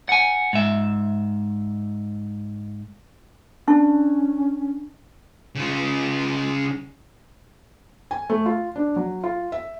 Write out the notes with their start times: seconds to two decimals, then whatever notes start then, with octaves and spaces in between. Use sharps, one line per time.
0.09 F#5 G#5
0.53 G#2 E5
3.68 C#4 D4
5.55 C#3 F4
8.11 G#5
8.30 A3
8.46 F4
8.76 D4
8.96 F#3
9.24 F4
9.52 E5